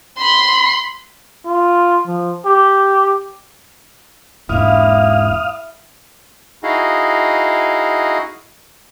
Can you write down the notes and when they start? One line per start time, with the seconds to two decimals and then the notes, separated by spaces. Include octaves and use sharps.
0.18 B5 C6
1.45 F4
2.06 F3
2.45 G4
4.49 E1 G#2 A#3 E4 F5 D#6 F6
6.63 D#4 E4 F#4 G#4 D#5 F5